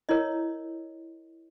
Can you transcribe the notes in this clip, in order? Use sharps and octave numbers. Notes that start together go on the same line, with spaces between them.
E4 A#4 C#5 D#5